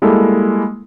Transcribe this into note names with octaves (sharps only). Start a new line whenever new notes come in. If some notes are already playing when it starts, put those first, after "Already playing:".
G3 G#3 A#3 E4 A4